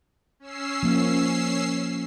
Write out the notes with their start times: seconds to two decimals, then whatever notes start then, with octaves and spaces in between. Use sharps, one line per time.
0.40 C#4 E6 C7
0.83 F3 A#3